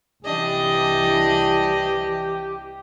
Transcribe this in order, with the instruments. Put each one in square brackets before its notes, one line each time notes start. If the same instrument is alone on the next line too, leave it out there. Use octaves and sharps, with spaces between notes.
[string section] C2 E3 [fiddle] D4 D#5 [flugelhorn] G4